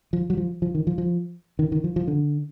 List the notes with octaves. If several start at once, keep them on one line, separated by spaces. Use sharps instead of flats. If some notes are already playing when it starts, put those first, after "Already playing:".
F3
F#3
F3
F3
D#3
F3
F3
D#3
D#3
F3
F3
D3